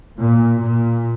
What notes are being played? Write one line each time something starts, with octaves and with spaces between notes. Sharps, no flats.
A#2
A#2